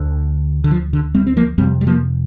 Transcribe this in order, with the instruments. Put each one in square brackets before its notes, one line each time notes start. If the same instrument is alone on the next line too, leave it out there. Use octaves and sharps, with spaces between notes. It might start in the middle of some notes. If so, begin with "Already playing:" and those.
Already playing: [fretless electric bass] D2 D3
D3
F3
D3
G3 C4
C4
F3 A#3
F2 C3 G3 C4
G3
F3 A#3